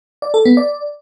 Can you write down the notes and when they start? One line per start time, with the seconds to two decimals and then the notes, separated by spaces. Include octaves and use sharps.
0.22 D5
0.34 A4
0.45 B3
0.57 D5